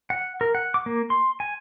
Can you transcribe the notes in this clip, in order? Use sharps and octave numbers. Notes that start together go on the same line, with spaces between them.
F#5
A#4
F#5
D6
A#3
C6
G#5